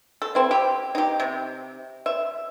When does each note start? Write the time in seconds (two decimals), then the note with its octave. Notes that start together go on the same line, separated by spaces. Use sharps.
0.22 A4
0.35 C4 E4
0.51 G4
0.95 D#4 G4
1.20 C3
2.06 E5